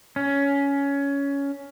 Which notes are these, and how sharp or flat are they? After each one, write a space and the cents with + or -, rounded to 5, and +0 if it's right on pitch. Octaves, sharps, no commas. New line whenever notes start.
C#4 +15